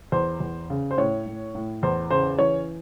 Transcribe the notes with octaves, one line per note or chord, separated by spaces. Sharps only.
E2 C5
E2
C#3
C5
A2 C#5
A2
A2
E2 C5
C#3 C5
E3 C#5